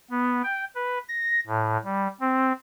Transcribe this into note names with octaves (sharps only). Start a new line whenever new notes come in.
B3
G5
B4
A#6
A2
G3
C4